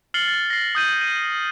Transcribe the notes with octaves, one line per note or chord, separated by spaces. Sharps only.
F6 A6 C7 C#7 F#7 G7
A6
A#6 C7
D#6 G6 D#7
D#7